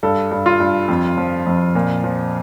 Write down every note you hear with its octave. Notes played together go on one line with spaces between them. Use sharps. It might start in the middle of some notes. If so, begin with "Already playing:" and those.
G2 A4
G2
F4
G2
F2
F3
F2
A#2
F3